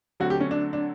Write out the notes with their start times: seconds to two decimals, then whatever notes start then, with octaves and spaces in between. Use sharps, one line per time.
0.20 D3 F#3 A3 C4 F#4
0.30 G4
0.40 C#4
0.51 D4
0.73 D4